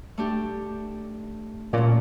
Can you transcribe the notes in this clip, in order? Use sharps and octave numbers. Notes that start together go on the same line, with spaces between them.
A3 D4 G4
A#2 A3 C#4